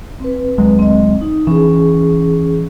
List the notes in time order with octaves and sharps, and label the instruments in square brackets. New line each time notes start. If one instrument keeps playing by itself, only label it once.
[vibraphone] C4 B4
[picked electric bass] D2 F#3 G#3
[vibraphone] C4 D#5
D#4
[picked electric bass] E3 [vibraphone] C#4 G#4